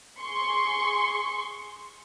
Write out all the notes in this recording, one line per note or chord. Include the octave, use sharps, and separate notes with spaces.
G#4 C6 C#6